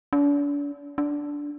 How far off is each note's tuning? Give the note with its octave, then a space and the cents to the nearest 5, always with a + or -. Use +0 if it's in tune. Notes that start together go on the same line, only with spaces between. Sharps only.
D4 -40
D4 -10